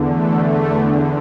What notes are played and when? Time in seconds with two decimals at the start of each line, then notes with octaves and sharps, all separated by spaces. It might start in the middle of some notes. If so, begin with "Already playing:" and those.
Already playing: E2 D3
0.09 A3
0.46 A3